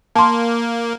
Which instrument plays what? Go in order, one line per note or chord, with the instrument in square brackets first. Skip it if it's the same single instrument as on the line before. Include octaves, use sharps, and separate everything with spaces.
[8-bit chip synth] A#3 [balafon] A5 C6